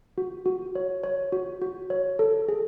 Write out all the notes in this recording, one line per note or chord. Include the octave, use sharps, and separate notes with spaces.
F#4
F#4
C#5
C#5
F#4
F#4
C#5
A4
G#4